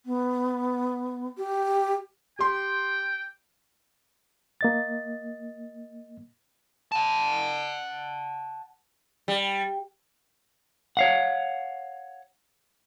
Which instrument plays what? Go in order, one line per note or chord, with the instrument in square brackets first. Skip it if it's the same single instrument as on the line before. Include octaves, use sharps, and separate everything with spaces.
[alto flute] B3
G4
[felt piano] G4 C6 [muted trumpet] G5
[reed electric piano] A#3 D#5 A6
[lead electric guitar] F#5 A5
[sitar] G3
[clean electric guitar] C#5 F5 F#5